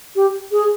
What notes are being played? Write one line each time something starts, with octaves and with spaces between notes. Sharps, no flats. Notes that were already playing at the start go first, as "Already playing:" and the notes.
G4
G#4